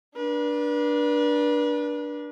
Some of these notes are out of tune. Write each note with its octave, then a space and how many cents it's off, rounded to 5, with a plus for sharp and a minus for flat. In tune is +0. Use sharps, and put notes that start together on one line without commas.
D4 +0 B4 -40